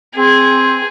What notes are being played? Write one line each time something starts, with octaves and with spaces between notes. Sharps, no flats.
C4 G#4